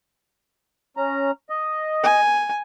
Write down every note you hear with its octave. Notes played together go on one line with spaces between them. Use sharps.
C#4 A#5
D#5
G#5